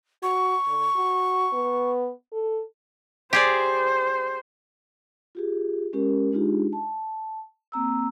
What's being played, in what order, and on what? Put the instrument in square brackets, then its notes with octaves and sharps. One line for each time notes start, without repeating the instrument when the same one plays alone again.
[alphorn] F#4 [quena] C#6
[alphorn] D3
F#4
B3
A4
[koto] G4 G#4 D5 [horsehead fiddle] C5
[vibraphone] F4 G4 G#4
G#3 C#4 G4 A#4
G#3 D4 D#4 F4 G4 G#4
A5
A#3 C4 A#5 E6